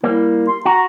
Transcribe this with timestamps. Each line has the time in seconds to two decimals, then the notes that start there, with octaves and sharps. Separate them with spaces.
0.04 G3 A#3 E4
0.48 C6
0.66 F#4 A#5